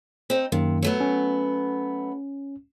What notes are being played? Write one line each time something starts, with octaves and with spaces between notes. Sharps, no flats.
C4 D#4
F#2 C3 D#3 A#3
F#3 A3 B3
C#4